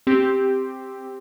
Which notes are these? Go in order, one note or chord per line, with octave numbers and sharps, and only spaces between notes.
C4 G4